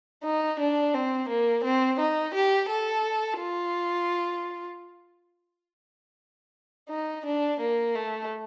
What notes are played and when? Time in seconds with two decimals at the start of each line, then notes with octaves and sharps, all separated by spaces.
0.23 D#4
0.59 D4
0.94 C4
1.29 A#3
1.64 C4
1.99 D#4
2.34 G4
2.70 A4
3.39 F4
6.90 D#4
7.26 D4
7.60 A#3
7.95 A3